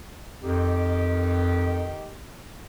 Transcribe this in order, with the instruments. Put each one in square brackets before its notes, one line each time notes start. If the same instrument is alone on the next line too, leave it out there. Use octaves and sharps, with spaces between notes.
[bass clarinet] F2 [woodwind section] D#3 G4